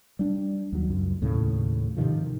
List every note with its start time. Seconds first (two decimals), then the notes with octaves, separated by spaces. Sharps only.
0.19 G3 D4
0.72 D#2 F#3
0.89 C#2 F#2
1.22 D#2 A2 C#3
1.97 G#2 C3 D#3 F3